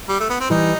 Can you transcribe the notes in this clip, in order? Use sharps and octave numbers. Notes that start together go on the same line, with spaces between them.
G3
A3
B3
C4
E3 G3 D#4